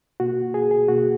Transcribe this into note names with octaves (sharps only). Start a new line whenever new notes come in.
B2 A#3 F#4
G#4
G#4
B2 A#3 F#4